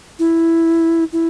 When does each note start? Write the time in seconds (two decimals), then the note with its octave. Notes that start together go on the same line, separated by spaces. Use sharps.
0.19 E4
1.13 E4